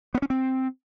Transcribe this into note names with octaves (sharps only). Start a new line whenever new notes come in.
B3
C#4
C4